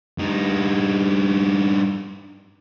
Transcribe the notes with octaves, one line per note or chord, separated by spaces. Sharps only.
G2 D#4